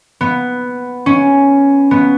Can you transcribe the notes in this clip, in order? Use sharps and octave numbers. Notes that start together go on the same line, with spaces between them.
B3
C#4
B3